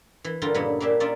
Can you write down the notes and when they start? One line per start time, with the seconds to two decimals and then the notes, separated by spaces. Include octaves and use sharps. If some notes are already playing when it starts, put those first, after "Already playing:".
0.24 E3
0.42 G2 D3 G3 F4 A#4
0.54 G2 A#2 C#3 B3 D#4 E4
0.80 A#3 D4 G4 G#4 E5
1.00 C#4 D#4 F4 A#4 D5 E5